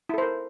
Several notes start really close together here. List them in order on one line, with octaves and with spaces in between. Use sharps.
E4 A4 C5 A#4